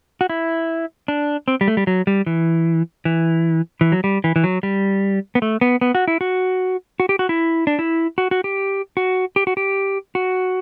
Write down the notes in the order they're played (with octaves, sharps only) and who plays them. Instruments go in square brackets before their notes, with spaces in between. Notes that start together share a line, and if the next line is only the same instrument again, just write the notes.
[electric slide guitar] F#4
E4
D4
C4
G3
A3
G3
F#3
G3
E3
E3
E3
F#3
G3
E3
E3
F#3
G3
B3
A3
B3
B3
F#4
E4
F#4
F#4
G4
F#4
E4
D4
E4
F#4
F#4
G4
F#4
G4
F#4
G4
F#4